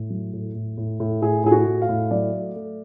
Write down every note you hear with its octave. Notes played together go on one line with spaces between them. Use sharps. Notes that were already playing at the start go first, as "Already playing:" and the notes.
Already playing: A2
F#3
A2
A2
A2
A2
A2 G#4
A2 G#4
F#4
A2
F5
A2
F#3 D5
A3
A3